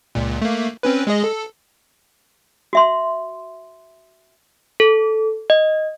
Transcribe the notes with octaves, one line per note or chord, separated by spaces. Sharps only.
C#2 A#2
A3 A#3
C4 C#4 B4
G#3 G#4 D#5
A4
F#4 E5 C6
A4
D#5